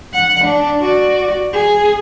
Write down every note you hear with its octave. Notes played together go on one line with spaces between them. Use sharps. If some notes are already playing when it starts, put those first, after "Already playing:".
F#5
D4
F#4 D5
G#4